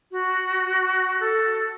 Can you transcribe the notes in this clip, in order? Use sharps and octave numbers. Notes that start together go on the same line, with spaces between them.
F#4
A4